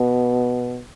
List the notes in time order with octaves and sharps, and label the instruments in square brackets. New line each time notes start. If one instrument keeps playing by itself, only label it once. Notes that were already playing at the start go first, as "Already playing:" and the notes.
Already playing: [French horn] B2